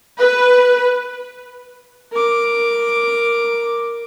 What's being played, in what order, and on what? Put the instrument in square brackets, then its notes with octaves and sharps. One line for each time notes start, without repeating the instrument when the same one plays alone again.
[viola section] B4
[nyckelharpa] A#4 D6